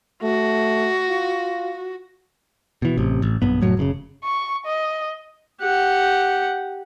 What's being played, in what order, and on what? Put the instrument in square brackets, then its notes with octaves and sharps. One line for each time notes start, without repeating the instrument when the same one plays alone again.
[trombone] A3 [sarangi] F#4
[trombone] F4
[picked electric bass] B2 E3
A1 C3
A1
B1 G2 B3
F1 A2 F#3
F#1 G#2 C#3
[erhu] C#6
D#5
[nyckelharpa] G4 F#5